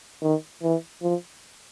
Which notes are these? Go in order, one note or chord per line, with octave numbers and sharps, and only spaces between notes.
D#3
E3
F3